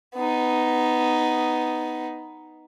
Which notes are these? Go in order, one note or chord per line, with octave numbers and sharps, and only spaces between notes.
B3 D#4